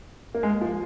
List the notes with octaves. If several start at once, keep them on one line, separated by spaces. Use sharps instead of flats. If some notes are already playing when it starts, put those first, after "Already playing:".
A#3
G#3
F3